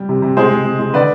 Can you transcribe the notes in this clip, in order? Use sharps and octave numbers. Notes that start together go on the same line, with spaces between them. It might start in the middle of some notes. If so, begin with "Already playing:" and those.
Already playing: G3 G4
C3
C3
G#3 G#4 C5
G#3
G#3
G#3
D3 B4 D5